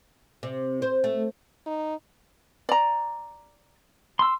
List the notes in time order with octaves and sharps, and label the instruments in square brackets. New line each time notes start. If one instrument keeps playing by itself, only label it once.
[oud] C3
C5
A3
[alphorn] D#4
[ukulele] D5 A#5
[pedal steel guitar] C6 E6